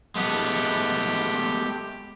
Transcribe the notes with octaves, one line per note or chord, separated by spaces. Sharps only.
G#3 A3 B3 G4